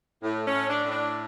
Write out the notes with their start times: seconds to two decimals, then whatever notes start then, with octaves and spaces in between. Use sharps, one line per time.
0.23 A2
0.44 C#4
0.52 A2
0.68 D4
0.83 A2
0.90 D4